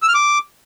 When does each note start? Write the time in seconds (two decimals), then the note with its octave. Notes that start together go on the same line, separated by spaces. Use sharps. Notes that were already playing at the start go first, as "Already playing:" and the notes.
0.02 E6
0.08 F6
0.14 D6